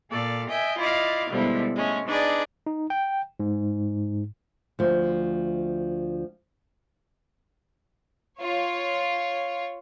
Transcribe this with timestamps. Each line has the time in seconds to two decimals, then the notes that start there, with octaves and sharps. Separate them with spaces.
0.10 A#2 A4 D5 F5
0.48 D#5 E5 G5 G#5
0.78 E4 F4 D5 D#5 F5
1.29 B2 D3 F3 G3 G#3 E4
1.75 G#3 A3 C#4
2.07 D4 D#4 G#4 B4 D5
2.67 D#4
2.90 G5
3.40 G#2
4.79 D2 F3
8.39 F4 C#5